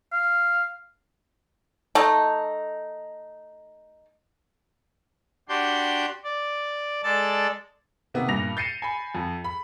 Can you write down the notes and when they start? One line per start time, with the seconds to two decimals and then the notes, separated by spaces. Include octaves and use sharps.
0.12 F5
1.95 A3 D#4
5.49 D4 F#4 G4 C6 G6
6.24 D5
7.03 G#3 A4 D5 A5 A6
8.14 C3 D#3 A#3 B3
8.28 G2 A#2 A#6 F7
8.57 G6 A6 C7 C#7 D#7 E7
8.82 G#5 B5
9.15 F2
9.44 B5